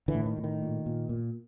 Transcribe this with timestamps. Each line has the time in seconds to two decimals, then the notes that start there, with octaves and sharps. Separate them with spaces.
0.08 D3 E3
0.14 A2
0.26 D#3
0.38 A2
0.44 D#3
0.62 A#2
0.86 A#2
1.09 A#2